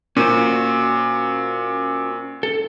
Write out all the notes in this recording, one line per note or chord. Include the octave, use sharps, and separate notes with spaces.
A#2 C#4 F#4 C5
A4